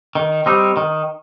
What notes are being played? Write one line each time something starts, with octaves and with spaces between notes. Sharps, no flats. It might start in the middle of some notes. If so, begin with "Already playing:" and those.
D#3
G3 C4 D#4
D#3